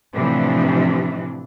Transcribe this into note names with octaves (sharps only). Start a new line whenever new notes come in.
A2 C3 E3 F3 D4